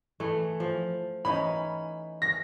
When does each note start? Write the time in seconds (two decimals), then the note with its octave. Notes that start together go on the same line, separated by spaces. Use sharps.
0.20 E3 A3
0.60 F3
1.25 E3 C#4 D#4 B5
2.22 A#6